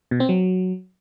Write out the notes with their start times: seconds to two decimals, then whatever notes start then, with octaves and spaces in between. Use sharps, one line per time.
0.11 B2
0.20 C4
0.29 F#3